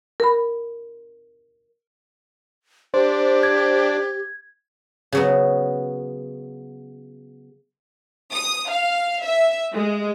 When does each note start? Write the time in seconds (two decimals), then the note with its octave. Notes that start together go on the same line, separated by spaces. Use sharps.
0.20 A#4 B5
2.94 D4 G4 C5
3.43 G#6
5.12 C#3 F#3 B3
8.32 D#6
8.69 F5
9.21 E5
9.74 G#3